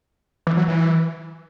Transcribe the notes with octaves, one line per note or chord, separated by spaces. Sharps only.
E3
F#3
E3